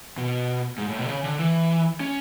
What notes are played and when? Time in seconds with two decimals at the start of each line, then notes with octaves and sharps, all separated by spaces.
0.17 B2
0.78 G#2
0.89 A2
0.99 B2
1.05 D3
1.09 C#3
1.24 D3
1.39 E3
2.00 C#4